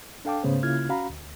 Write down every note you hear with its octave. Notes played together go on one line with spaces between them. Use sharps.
D4 A4 F5 G5 A5 D6
G#2 C#3 A3 B3 C5
C#3 A#3 E4 F4 F6 G#6
C#4 F#4 F5 A#5 B5
D2